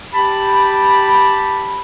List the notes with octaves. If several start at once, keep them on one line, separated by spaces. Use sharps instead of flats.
G4 A5 B5